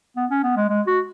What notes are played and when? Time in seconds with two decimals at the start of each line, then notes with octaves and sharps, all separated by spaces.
0.16 B3
0.31 C#4
0.43 B3
0.56 G#3
0.69 G#3
0.87 F#4